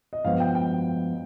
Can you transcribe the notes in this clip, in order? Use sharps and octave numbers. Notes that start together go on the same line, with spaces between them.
D#5
G2 F3 G#3 B3 F5
G5
G5